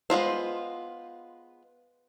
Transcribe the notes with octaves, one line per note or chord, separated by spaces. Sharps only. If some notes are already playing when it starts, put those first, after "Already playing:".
G#3 B3 F4 C5